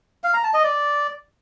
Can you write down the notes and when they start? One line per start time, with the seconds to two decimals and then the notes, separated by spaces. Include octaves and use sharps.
0.24 F5
0.34 A#5
0.44 A5
0.54 D#5
0.64 D5